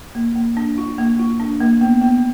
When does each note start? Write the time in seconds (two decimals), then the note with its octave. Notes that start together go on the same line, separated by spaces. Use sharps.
0.15 A#3
0.36 A#3
0.57 D4
0.78 F4
0.98 A#3
1.19 F4
1.40 D4
1.60 A#3
1.81 B3
2.01 B3